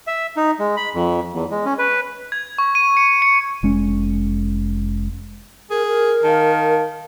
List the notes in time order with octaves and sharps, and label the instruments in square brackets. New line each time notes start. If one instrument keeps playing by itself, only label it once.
[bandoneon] E5
D#4
G#3
B5
F2
E2
G#3
C#4
B4
[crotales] G#6
C#6
D#7
C#7
C#7
[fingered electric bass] F1 G#3 C#4
[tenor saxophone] G#4 [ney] A#4
[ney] A#4
[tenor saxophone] D#3 [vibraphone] F5 A5